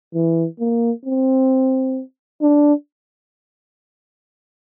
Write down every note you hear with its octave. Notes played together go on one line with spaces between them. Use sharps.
E3
A#3
C4
D4